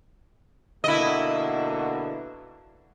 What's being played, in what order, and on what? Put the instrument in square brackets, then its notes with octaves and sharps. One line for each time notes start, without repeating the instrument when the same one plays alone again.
[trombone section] B2 D3 A#3 [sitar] E4 D#5